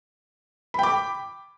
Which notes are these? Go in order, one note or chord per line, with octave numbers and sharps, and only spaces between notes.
G5 B5 D6